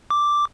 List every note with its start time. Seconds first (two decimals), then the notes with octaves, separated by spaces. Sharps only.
0.10 D6